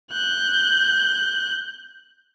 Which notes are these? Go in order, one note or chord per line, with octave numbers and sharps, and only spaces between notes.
F#6 G6